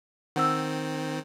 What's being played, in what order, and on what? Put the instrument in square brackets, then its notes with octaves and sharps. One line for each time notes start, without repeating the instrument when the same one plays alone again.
[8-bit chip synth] D#3 C4 [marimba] F#5 E6